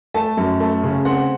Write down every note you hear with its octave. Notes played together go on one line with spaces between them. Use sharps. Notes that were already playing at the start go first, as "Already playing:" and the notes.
A3 A5
F#2
A3
C#3
C4 F#5